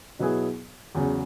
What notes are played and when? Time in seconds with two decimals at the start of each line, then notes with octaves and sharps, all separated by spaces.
0.19 B2 F#3 B3 E4 G#4
0.95 E2 C#3 F#3